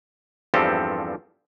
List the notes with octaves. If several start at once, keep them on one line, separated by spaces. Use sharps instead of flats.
E2 G2 F3 C4 G4 A4